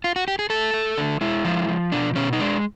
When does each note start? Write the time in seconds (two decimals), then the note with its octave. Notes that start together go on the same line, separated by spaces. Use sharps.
0.04 F4
0.16 F#4
0.28 G4
0.39 G#4
0.50 A3 A4
0.74 A3
0.98 D3
1.21 G#3 E4
1.45 F3
1.68 F3
1.92 B2 D4
2.16 B2 C#4
2.33 D#4
2.40 G#3 D4